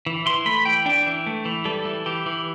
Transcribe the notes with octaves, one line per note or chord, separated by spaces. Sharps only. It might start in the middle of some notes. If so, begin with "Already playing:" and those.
E3
E3 C6
A3 B5
E3 G5
D4 G5
E3
A3
E3
G3 A4
E3
E3 G4
E3